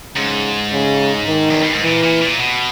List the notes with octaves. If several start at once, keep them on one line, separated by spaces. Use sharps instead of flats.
G#2 C#3
C#3
D#3
E2
G2
G#2
A#2 E3
A#2
A#2
B2